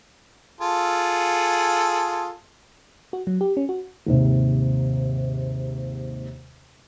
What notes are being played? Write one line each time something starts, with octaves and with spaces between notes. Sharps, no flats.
F4 G#4 A4
F#4
F#3
G4
C#4
F#4
D#2 G#2 C3